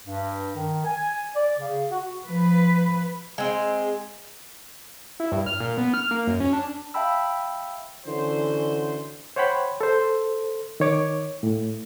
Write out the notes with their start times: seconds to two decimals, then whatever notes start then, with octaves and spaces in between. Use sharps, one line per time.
0.07 G2
0.56 D#3
0.85 G#5
1.35 D5
1.58 C#3
1.90 F#4
2.26 F3 B4
3.38 G#3 C4
5.20 E4
5.32 G2
5.46 F6
5.60 A#2
5.78 B3
5.94 F6
6.11 A#3
6.27 F#2
6.40 C#4
6.53 D4
6.94 E5 F5 G5 A5 B5 E6
8.05 D3 E3 C#4 F#4 C5
9.36 C5 C#5 F#5 G5 B5
9.81 A4 C5
10.80 D#3 C#5 D6
11.43 A2